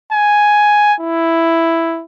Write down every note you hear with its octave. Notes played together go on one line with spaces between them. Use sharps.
G#5
E4